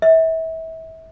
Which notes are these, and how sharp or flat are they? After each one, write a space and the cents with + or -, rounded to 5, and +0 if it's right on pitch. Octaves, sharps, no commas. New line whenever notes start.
E5 -30